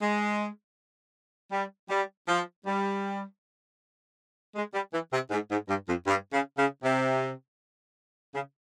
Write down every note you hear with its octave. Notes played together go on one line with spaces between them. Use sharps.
G#3
G3
G3
F3
G3
G#3
G3
E3
C3
G#2
G#2
G2
F2
G2
C#3
C#3
C3
C#3